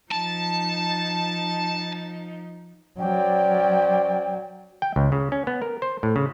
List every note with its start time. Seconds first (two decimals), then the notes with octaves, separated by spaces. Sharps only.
0.12 F3 D#4 A5
2.99 F#3 C#4 C5 D5 G5
4.82 G5
4.96 C#2
5.12 C#3
5.32 C#4
5.47 B3
5.62 A#4
5.82 C5
6.03 A2
6.16 C#3